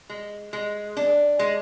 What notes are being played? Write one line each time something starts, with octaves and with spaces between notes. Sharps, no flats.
G#3
G#3
D4
G#3